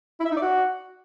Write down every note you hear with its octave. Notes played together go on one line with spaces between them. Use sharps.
E4
E5
D#4
D5
F#4